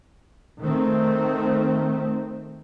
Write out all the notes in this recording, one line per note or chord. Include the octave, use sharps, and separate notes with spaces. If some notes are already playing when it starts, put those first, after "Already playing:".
D#3 A3 C4